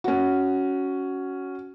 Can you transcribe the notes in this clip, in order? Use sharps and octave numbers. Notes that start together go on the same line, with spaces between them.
C#4 F#4